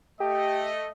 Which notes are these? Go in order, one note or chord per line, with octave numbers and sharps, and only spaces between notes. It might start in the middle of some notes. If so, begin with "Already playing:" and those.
A3 G4 D#5